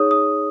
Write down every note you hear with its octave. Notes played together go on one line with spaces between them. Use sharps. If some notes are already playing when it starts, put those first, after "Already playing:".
Already playing: D#4 G#4 C#5 D#6
D#6